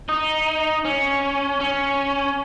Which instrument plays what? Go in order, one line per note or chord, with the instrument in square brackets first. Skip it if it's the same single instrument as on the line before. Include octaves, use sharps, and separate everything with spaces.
[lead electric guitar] D#4
C#4
C#4